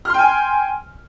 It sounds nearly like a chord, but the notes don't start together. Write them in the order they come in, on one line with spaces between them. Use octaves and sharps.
F6 C6 G5 G#5